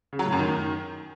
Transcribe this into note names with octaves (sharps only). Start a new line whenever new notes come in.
C#3
F#3
A2
F#2
D#3